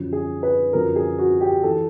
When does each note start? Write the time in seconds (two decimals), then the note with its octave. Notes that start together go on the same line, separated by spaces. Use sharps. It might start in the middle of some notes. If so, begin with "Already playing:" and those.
Already playing: F#2 D3 F3
0.13 G#4
0.43 B4
0.73 F#2 D3 F3 A#4
0.96 G#4
1.18 F#4
1.41 G4
1.63 E3 A4